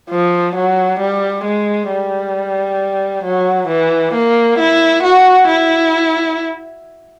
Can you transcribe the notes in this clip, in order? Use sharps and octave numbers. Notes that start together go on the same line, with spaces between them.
F3
F#3
G3
G#3
G3
F#3
E3
A#3
E4
F#4
E4